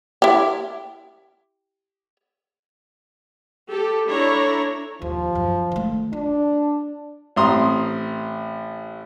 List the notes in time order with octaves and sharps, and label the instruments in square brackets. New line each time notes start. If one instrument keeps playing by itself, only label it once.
[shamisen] E4 G4
[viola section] G4 A4
D4 E4 A4 C#5 A#5
[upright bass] D#2 [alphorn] F3
[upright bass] F#2
D#3 A3
[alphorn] D4 [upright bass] F4
[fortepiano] A1 C4 A#5 C6 D#6